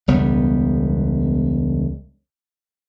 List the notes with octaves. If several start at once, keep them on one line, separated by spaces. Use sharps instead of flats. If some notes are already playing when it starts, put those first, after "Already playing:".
E1 C#2 G3 B3